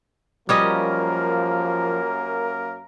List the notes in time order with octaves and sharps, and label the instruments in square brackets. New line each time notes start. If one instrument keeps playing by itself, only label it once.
[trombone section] F#2 A#3 [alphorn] F3 [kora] G3 C#4 D#5 [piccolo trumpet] A#4